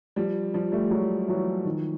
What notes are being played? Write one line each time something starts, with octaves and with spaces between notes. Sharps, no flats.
F3 G3
F3 G3
G3 A3
F#3 G#3
E3 F#3
D#3 F3